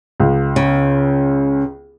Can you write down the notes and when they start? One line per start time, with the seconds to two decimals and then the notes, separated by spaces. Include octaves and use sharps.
0.20 C#2
0.56 C#3